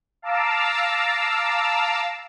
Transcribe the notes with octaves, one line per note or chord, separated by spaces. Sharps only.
F5 A5 A#5 D6 E6